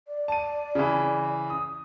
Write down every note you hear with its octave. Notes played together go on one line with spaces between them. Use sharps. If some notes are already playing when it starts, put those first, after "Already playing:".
D5
A5 D#7
C#3 E3
D#6